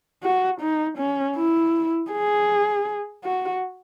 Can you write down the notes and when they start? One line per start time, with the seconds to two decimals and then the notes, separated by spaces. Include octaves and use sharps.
0.23 F#4
0.61 D#4
0.98 C#4
1.37 E4
2.12 G#4
3.25 F#4